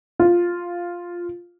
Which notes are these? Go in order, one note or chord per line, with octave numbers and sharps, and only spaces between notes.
F4